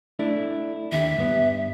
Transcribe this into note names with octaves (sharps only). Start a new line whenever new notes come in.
A3 D4 E4
D#2 D3 E5
G2 B3